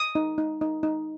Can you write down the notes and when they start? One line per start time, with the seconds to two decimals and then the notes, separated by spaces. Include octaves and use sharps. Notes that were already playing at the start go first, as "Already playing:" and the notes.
Already playing: D#6
0.15 D#4
0.38 D#4
0.61 D#4
0.83 D#4